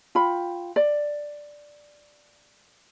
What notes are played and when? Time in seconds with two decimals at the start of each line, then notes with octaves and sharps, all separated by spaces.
0.15 F4 G5 B5
0.76 D5